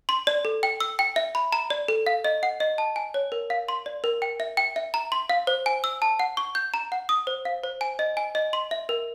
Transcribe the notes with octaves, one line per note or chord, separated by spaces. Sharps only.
C6
D5
A4
G5
E6
G5
E5
B5
A#5
D5
A4
F5
D#5
F#5
D#5
A5
G#5
C#5
A#4
F5
C6
D5
A#4
G5
E5
G5
E5
A#5
C6
F5
C5
G#5
E6
A5
F#5
C#6
G6
A#5
F#5
D#6
C5
F5
C5
G#5
D#5
G#5
D#5
C6
E5
A#4